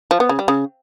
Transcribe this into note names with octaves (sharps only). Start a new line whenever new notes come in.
F3
B3
C#3
G3
C#3